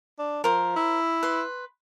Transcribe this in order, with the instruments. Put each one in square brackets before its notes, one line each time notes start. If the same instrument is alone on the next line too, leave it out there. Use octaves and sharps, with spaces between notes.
[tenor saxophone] D4
[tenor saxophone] F3 [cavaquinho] A#4 C5
[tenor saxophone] E4
[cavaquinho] B4 C6